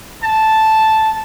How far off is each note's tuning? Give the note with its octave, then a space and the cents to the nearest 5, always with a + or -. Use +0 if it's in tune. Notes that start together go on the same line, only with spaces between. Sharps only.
A5 -5